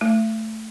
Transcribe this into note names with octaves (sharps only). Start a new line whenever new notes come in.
A3